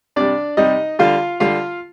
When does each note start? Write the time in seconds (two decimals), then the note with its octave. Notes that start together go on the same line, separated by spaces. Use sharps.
0.16 C3 G3 D4 D5
0.57 C3 G3 D#4 D#5
0.99 D3 G3 F4 F5
1.40 D3 G3 F4 F5